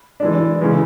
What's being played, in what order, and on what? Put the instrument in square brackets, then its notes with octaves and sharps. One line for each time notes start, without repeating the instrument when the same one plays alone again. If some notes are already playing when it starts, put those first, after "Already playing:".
[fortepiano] E3 G#3 D4
C#3 E3 G#3 B3